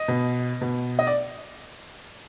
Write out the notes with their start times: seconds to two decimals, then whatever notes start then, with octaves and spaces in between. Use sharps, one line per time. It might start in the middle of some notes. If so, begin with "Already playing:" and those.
Already playing: D#5
0.08 B2
0.61 B2
0.99 D#5
1.07 D5